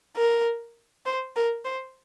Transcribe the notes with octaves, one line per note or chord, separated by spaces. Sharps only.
A#4
C5
A#4
C5